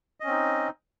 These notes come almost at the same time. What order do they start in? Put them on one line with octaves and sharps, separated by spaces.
D#5 C#4 C4 D#4